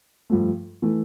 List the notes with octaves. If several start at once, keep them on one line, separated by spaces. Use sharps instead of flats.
G2 F3 A3
E3 A3